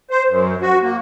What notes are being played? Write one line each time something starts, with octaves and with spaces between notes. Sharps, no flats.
C5
F#2
F#4
A#3